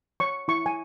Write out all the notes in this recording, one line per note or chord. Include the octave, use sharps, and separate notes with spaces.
C#5 C#6
E4 C#6
G#5